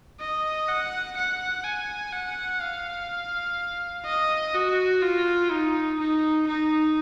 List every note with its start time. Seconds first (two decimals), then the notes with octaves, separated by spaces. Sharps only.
0.20 D#5
0.69 F#5
1.17 F#5
1.64 G#5
2.13 F#5
2.61 F5
4.06 D#5
4.54 F#4
5.02 F4
5.51 D#4
5.99 D#4
6.47 D#4